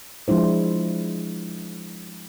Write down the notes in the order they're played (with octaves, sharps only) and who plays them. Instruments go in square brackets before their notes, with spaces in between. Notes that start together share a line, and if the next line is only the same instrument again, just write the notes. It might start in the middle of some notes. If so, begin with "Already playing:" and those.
[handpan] F3 G#3 D4 E4 C5